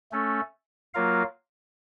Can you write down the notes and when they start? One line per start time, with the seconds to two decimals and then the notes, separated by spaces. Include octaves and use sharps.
0.12 A3 C#4 A4
0.94 F#3 A#3 F4 A#4 F5